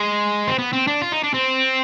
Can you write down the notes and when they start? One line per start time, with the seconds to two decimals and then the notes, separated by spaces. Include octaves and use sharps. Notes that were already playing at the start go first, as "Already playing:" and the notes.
Already playing: G#3
0.47 C4
0.58 B3
0.73 C4
0.87 D4
1.02 F4
1.12 D#4
1.23 D4
1.34 C4